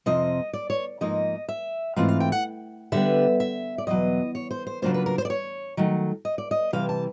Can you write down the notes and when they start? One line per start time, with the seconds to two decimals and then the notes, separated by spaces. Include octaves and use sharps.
0.06 F2 C3 F3 C4 D#5
0.53 D5
0.70 C#5
1.01 G#2 F3 A#3 D#4 D#5
1.48 E5
1.96 G#2 E3 A3 C4 F4 F5
2.09 F5
2.20 G5
2.32 F#5
2.92 D3 G3 B3 E5
3.40 E5
3.78 D5
3.87 E2 B2 F#3 D#5
4.35 C#5
4.51 C5
4.67 C5
4.82 C#3 F#3 A#3 D4 F4 C5
4.94 B4
5.06 A#4
5.18 C5
5.25 D5
5.30 C#5
5.77 D#3 F#3 A3
6.25 D#5
6.38 D5
6.51 D#5
6.73 C3 E3 G3 F5
6.89 A5